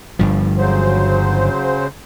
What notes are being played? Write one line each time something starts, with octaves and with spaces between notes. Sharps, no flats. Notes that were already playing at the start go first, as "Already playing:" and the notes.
G1 G2 F3
C#3 F#3 C5